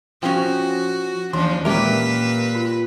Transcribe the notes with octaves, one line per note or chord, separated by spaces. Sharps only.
F3 C#4 F#4 G5 C#6
D#2 E3 F3 C#4 D4
A#2 G#3 C#4 G4 A#4 B4 D6
F4